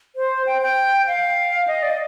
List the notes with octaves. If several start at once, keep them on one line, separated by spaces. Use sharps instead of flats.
C5
G5
G5
F5
D#5
D5
D#5